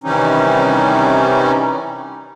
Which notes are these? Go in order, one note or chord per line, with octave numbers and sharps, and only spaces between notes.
C3 D#3 E3 G3 C#4 D#4